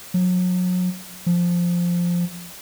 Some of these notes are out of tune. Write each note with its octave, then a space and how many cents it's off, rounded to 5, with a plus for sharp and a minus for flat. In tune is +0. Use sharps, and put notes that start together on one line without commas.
F#3 -35
F3 +0